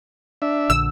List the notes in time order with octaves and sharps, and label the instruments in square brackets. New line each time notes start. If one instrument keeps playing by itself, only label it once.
[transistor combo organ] D4 E5
[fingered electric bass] A#1 D3 [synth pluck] E6